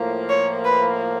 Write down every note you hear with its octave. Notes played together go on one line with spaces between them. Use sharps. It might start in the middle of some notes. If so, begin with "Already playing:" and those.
Already playing: A2 F3 A#3
C#5
B4